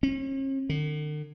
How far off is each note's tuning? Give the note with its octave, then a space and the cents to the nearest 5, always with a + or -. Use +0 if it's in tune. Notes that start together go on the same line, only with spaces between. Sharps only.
C#4 -45
D3 +45